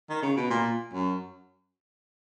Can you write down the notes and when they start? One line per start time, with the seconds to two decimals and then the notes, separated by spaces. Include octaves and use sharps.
0.10 D#3
0.23 C#3
0.37 B2
0.50 A#2
0.93 F#2